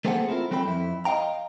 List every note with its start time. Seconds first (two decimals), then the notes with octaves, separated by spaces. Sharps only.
0.05 A3 A#3 C4 G#4 A4 F#5
0.29 C4 E4 F4 A#4
0.51 F#3 C4 A4 G5 B5
0.66 F2 E4
1.05 D#5 F5 G5 A#5